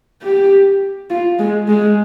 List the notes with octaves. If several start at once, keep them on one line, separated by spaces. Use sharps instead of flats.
G4
F4
G#3
G#3